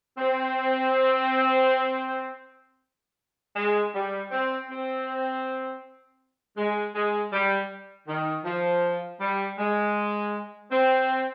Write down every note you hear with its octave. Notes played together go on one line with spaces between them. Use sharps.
C4
G#3
G3
C4
C4
G#3
G#3
G3
D#3
F3
G3
G#3
C4